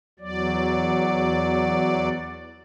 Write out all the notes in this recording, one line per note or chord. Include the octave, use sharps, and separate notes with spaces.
E2 F#3 D5